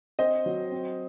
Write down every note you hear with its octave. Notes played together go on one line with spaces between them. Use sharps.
C4 C5 D#5
F#3
C4